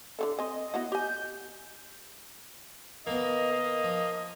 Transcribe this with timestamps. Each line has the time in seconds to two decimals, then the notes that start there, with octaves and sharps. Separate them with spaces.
0.19 D3 E3 E4 A4
0.39 C4 D#5 G#5
0.74 B3 E4 F#4
0.92 G4 G#5 G6
3.07 D#2 D#3 A#3 B3 D#5
3.52 A#3
3.84 F3